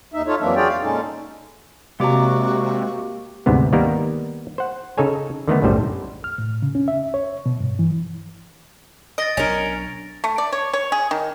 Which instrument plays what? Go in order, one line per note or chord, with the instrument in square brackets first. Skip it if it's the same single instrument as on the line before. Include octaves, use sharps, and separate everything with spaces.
[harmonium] D#2 D#4 E5
D#4 F4 A4 C#5
F2 E3 F#3 A#3 D4 E5
F4 F#4 G#4 C#5 D5 G5
F2 F5
A#2 G#3 C#4 D#4 A4
[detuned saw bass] C3 [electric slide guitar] G#3 D5 A#5 [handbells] A#3 G4 D6 [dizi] F#4
[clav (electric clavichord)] D2 G#2 C3 B3
D#3 G3 A#3 B3 A#4
C5 F#5
C#3 D#4 A4 C#5 G#5
D3 D#3 A3 B3
B1 F#2 A2 G3 C5
[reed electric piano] F6
A2
C#3
C#4
E5
C#5
B2
G2
E3
[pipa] D#5 [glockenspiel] A6 A#6 D7
[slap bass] B1 D4 [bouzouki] C#4 A#4
[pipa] A3
D5
C#5
C#5
G#4
D#3